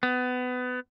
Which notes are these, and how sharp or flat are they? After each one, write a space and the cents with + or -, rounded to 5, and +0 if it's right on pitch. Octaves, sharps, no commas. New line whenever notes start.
B3 +25